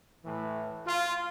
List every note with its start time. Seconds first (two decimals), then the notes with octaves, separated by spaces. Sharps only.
0.23 A2 E3
0.86 F4